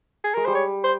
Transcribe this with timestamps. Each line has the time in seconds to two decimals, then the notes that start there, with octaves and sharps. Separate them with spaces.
0.24 G#4
0.34 G#3 A#4
0.45 G3 C5
0.55 C#5
0.84 C5